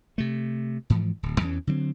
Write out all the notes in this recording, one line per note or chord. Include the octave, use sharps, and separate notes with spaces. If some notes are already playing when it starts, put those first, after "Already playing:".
C3 A3
G#2 E3 F3
D1
E2 E3 A#3 C#4
D3 F#3 A3 C4